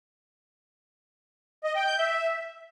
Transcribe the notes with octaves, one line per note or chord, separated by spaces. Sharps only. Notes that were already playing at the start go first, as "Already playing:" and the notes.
D#5
G5
G6
E5